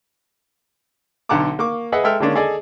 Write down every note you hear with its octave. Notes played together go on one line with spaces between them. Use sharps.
B1 D3 F#5 A5 A#5 D6
A#3 C#6 D6
G#4 B4 D#5 E5 F#5
G#3 A4 E5 G5 F6
D3 D#3 G#3 A#3 C#4 D4
G#4 A4 D5 D#5 G#5